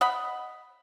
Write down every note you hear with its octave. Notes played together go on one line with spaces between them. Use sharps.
D#5 F#5 B5